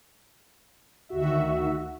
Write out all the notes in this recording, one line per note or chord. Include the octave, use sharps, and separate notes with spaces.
D2 D#3 F#4 E5